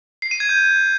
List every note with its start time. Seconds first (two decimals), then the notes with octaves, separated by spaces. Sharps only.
0.22 C7
0.31 D#7
0.40 G#6
0.49 G6